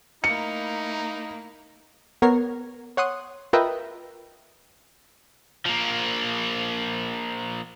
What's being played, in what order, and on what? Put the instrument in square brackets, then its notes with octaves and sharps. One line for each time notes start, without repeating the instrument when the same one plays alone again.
[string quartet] A3 A#3 E4 [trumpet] D#4 [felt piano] C#7
[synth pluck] B3 A#4 C#5 A#5 C7
C#5 F#5 C6 D#6
F4 A#4 B4 D#5 E5 G5
[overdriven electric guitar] F3 A#3